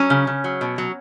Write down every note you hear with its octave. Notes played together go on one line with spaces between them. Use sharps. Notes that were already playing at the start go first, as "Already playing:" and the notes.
Already playing: F#3 C#4
C#3
C#3
F#3
B2
F#3